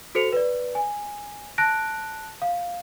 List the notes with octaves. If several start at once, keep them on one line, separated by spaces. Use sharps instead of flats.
F#4 A4 C5 C#7 F7
B4 D5
G#5
A5 F#6 A#6 D7
F5